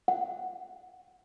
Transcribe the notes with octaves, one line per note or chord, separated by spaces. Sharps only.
F#5